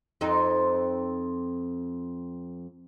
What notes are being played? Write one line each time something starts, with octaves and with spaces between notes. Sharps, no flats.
F2 C4 D#4